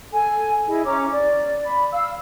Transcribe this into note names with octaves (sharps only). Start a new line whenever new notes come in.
A4 G#5
E4 G#4 D#5
C#4 C#5 A#5 D6
D5
B5
F5 E6